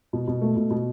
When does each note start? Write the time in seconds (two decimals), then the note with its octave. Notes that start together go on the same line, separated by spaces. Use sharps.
0.13 B2
0.28 B2
0.41 A3
0.56 B2
0.71 B2